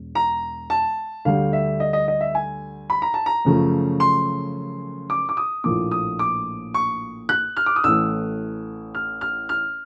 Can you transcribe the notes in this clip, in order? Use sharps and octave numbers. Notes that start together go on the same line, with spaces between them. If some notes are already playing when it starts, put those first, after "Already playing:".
Already playing: E1
A#5
A5
D2 D3 G3 F5
E5
D#5
D#5
D#5
E5
G#5
B5
A#5
A5
A#5
F#2 C#3 F3 A3 C#4
C6
D6
D6
D#6
A#1 A2 F3 A#3 D6
D#6
D6
C#6
F#6
F6
D6
D#6
A1 A2 E3 A3 E6
F6
F6
F6